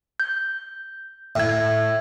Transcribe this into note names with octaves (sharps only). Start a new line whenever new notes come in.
G6
A2 E5 G#6